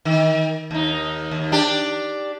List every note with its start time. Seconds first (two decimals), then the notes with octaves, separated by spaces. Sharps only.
0.05 D#3
0.71 D#2 D#4
1.31 D#2
1.52 D4 G4